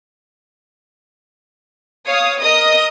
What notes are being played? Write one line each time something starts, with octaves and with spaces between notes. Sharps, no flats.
C#5 F5 D#6
A#4 D#5 D#6